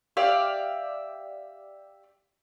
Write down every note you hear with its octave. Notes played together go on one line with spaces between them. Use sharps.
G4 D5 E5 F5